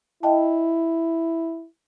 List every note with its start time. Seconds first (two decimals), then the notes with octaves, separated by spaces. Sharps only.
0.23 E4 D#5 G5 A5